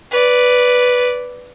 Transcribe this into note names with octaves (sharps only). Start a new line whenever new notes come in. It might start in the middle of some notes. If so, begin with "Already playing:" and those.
B4 D5